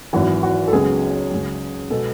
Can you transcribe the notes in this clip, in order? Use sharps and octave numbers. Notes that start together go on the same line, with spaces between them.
G#1 F#2 E3 F#4
F#4
A4
C#2 C#3 F#3 B3 G#4
C#2 C#3 F#3
B2 G#3 B3 A4